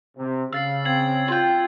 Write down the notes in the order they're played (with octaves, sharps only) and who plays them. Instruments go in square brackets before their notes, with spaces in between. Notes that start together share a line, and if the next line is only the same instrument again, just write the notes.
[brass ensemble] C3
[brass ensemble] C#3 [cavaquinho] F5 [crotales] E6 A6 C7
[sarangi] C4 [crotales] G#6 C7 F#7
[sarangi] F4 [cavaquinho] G5 C6